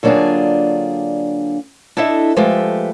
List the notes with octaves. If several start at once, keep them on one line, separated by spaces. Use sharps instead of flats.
D3 F#3 A#3 D4 F4 G#4
D4 E4 A4 D#5 E5
F3 G#3 A3 G4 B4